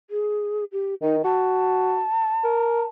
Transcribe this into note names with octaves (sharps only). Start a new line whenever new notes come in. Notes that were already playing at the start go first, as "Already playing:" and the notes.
G#4
G4
D#3 D#4
F#4 A5
A#4